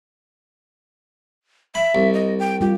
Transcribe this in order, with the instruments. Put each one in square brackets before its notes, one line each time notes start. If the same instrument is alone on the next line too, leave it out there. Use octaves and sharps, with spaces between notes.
[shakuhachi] E5 [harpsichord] B5
[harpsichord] C2
[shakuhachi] D#5
G5
[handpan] G3 F4 [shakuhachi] G4